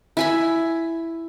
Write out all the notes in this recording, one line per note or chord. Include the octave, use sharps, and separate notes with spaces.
E4 G#5 B5